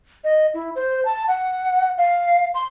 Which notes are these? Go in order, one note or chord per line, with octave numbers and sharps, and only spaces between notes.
D#5
E4
C5
A5
F#5
F5
C6